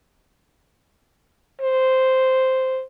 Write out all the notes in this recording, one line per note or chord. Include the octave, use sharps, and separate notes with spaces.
C5